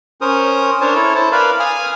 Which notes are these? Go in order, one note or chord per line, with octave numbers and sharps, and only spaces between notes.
C#4 A#4 C5 D#6
D4 A#4 C5 C#5 A5
E4 A4 C#5
E4 C5 A5
A#4 B4 D5 F5 B5
F5 G#5 D#6 F6